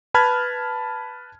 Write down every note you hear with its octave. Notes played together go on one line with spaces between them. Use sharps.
B4 A5 B5 F6 G#6